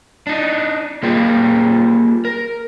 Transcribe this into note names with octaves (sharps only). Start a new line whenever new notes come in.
D4 D#4
A#3 F4 G4 G#4 A#4
A#4